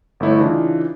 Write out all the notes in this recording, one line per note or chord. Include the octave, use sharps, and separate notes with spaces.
G1 A3 E4 C#5
C#3 E3 D4 D#4 F4